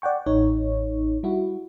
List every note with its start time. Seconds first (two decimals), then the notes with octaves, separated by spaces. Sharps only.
0.02 D5 F#5 G5 C#6
0.26 A1 D#4 C#5
1.23 G3 E4 F#4